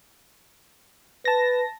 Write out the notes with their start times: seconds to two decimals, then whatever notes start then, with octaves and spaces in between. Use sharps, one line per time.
1.25 B4 A5 A#6